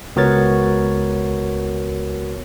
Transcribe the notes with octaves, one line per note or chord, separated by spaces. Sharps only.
C#2 B3 F#4 A#4 C#5 A6